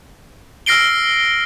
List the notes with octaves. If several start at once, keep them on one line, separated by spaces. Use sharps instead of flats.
E6 F6 A#6 C7 D7 G7